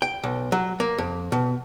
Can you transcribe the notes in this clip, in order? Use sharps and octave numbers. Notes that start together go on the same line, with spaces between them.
G5
B1
F#3
A#3
F2
B2